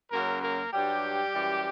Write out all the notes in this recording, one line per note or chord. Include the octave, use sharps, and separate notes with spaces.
F#2 C#3 F#3 A#3 A#4
A#3 A#4
G2 F#3 G3 G4
F#2 E3 G3